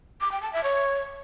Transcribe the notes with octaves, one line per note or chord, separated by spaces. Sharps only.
D6
G5
A5
E5
C#5